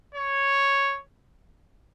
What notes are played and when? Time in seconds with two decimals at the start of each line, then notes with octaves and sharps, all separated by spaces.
0.15 C#5